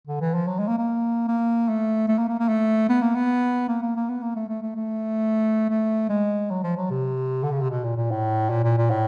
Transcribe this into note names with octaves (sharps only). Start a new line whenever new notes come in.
D3
E3
F3
F#3
G#3
A#3
A#3
A#3
A3
A3
A#3
A#3
A#3
A3
B3
A#3
B3
A#3
A#3
A#3
B3
A#3
A3
A3
A3
A3
A3
G#3
F#3
F3
F#3
C3
D3
C#3
C3
B2
A#2
A#2
A2
A#2
A#2
A#2
A2